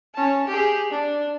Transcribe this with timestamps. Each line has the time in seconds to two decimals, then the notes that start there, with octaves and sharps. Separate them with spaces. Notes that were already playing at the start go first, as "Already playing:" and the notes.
0.15 C#4 A5
0.48 G4 G#4
0.91 D4